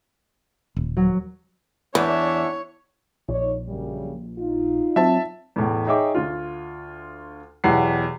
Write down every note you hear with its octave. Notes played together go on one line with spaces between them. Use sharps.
D#1
F#3
E2 D4 B4 C#5 E5
A#1 D#4 C#5 D5
F#2 C#3 G3
D#4 F4
F#3 C4 E5 A5
E2 A2
D#4 G#4 C#5 E5 G5 D6
D2 F4
E2 B2 F#3 G4 F#5 C7